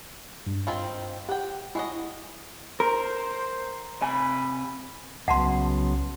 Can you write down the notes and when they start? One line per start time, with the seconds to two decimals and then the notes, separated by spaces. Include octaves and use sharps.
0.46 G2
0.67 D#3 C4 F4 C6
1.29 G4 F#5 G5
1.75 G#3 E4 F#4 D#5
2.80 A#4 C5
4.02 C3 G#5 B5
5.28 C2 C#3 F#3 B3 F#5 A5 C6